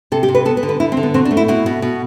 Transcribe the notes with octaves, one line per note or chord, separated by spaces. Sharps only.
C3 A4
G4
C3
B4
B3 A4
B4
D3
B4
D3 E4
C4
D3
B3
B2 C4
D4
A3
E4
B2 E4
B2
B2